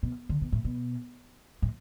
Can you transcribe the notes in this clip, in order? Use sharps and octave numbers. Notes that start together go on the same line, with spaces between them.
B2
D3
B2
A2
B2
A2